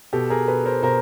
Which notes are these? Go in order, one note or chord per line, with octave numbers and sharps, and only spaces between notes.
B2 G4 A4
G#4 A#4
B2 A4 B4
A#4 C5
B2 A#4 C5